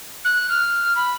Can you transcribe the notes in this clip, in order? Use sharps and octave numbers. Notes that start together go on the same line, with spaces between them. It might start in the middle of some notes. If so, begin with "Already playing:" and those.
F#6
F6
B5